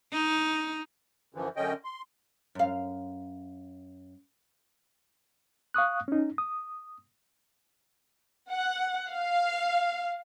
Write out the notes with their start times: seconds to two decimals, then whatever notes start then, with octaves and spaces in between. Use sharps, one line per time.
0.13 D#4
1.35 F#2 D3 E3 F3
1.56 F#2 D3 C#4 D#5 G5
1.84 C6
2.55 F#2 F5
5.74 F5 C#6 D#6 F#6
6.08 C#4 D#4
6.38 D#6
8.50 F#5
9.12 F5